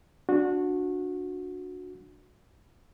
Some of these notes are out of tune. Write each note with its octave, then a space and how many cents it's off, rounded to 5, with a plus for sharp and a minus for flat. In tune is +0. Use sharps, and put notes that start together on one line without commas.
D4 +0 F#4 -20